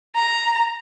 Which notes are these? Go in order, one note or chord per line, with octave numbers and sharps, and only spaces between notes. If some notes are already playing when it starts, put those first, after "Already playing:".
A#5